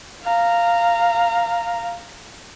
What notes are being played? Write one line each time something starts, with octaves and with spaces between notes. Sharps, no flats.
F5 A#5